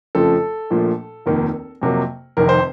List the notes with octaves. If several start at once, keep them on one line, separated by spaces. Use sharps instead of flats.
F2 C#3 F3 A3 A4
A#1 A#2 F3 A3
F1 D#2 D#3 A#3
F2 C3 F#3 A#3
F1 F2 C3 D#3 A#4
C5